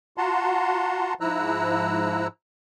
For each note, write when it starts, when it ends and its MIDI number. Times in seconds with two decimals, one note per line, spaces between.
0.18 1.14 65
0.18 1.14 66
0.18 1.14 78
0.18 1.14 81
0.18 1.14 82
0.18 1.14 84
1.21 2.27 44
1.21 2.27 53
1.21 2.27 64
1.21 2.27 82
1.21 2.27 88
1.21 2.27 90